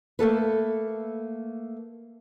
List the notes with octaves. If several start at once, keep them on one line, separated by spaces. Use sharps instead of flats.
A3 A#3 A4 B4